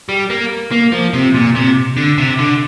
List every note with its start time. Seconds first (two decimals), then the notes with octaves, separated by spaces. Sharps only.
0.09 G3
0.30 A#3
0.71 A#3
0.92 F3
1.13 C3
1.35 A#2
1.55 C3
1.97 D3
2.18 C3
2.39 D3